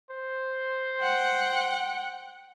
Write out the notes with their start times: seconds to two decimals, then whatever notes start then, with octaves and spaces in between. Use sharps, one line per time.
0.10 C5
1.01 F#5 G5